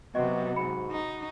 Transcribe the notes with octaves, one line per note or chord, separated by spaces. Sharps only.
C3 F#3 B3 F#4 D#5
G#2 B5 C#7
D#4